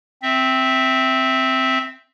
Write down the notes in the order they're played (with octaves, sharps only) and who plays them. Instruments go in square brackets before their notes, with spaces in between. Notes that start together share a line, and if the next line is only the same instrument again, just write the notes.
[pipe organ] C4 E5